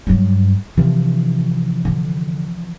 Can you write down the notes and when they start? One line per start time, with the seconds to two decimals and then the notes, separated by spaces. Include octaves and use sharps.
0.07 G2 F#3
0.77 C3 E3 F3 D4
1.85 D3